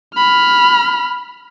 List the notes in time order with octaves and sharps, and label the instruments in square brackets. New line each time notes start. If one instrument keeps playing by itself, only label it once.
[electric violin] B5 F6